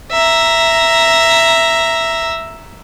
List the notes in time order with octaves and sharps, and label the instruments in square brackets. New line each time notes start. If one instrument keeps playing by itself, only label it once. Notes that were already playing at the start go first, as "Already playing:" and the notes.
[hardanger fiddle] E5 A#5